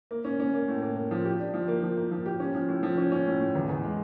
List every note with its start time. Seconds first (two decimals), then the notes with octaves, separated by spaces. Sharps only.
0.11 A#3
0.25 C#4
0.40 C#4
0.54 A#3
0.68 A2
0.82 A#3
0.96 A#3
1.11 F3
1.25 G4
1.39 D4
1.54 F3
1.68 A#3
1.83 F3
1.97 A#3
2.11 F3
2.26 G4
2.40 C#4
2.55 F3
2.68 A2
2.83 F3
2.97 C#4
3.12 C#4
3.26 A2
3.40 A2
3.55 E2
3.69 E2
3.83 G#3